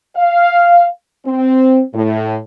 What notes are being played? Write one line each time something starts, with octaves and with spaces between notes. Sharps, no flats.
F5
C4
A2